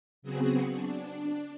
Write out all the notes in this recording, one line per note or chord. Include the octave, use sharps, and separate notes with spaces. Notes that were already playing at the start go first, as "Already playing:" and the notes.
C#3 F#3 B3 C4 F#4 G#4
D4